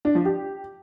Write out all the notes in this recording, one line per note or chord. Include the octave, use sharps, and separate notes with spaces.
D4
F3
G4